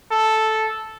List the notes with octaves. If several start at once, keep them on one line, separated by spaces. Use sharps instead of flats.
A4